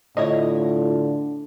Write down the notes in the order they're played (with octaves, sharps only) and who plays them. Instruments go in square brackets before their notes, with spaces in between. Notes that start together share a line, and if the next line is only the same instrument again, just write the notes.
[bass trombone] A2 [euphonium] D3 [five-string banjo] E4 C#5 D#5 [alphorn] F4